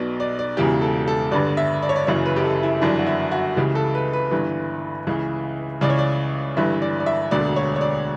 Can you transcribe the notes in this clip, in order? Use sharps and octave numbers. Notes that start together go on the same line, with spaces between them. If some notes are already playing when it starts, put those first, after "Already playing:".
Already playing: B1 B2 D5
D5
D5
E1 E2 C#3 E3 G4
A4
A4
G1 G2 D3 D5
E5
D5
C#5
D5
F#1 F#2 C#3 E3 C#5
B4
G4
A4
E4
G1 F#2 E3 D4
F#4
E4
F#4
C#2 C#3 E3 G4
A4
B4
B4
G1 G2 E3
C#2 C#3 E3
C#2 C#3 E3 D5
C#5
D5
G1 G2 E3 E5
D5
D5
E5
E1 D2 D3 D5
C#5
C#5
D5